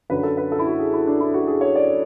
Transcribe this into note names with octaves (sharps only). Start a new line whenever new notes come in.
F#2 D3 F#3 B4
A4
B4
A4
E4
F#4
G#4
E4
D4
E4
F#4
G#4
C#5
D5